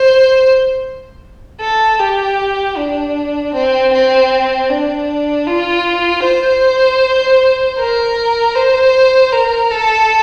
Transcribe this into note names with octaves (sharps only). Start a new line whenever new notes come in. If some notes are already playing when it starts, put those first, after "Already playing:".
Already playing: C5
A4
G4
D4
C4
C4
D4
F4
C5
A#4
C5
A#4
A4